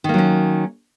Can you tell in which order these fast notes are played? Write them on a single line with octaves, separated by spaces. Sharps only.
D#3 A#3 F#3 C#4